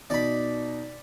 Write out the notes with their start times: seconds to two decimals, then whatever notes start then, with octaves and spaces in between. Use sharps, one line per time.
0.10 B2 D#4 D5 B5